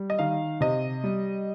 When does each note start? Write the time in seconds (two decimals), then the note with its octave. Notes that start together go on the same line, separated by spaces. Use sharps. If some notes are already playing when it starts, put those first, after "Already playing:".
Already playing: G3
0.10 D#5
0.19 D#3 F5
0.61 C3 D#5
1.04 G3